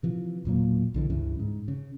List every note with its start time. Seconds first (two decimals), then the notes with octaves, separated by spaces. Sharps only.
0.03 C3 E3 F3
0.45 E1 A#2 F#3 A#3
0.94 B1 D3 E3
1.10 C#2 G2 C#3 E3
1.40 G#2
1.68 C#3